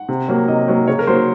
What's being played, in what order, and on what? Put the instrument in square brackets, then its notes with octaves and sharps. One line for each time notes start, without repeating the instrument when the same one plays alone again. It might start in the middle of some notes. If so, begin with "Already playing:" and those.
Already playing: [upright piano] F#5
C3
F#3 A#3
C3 D#5
F#3 A#3
C#3 C#5
A#4
F#3 A#3 C5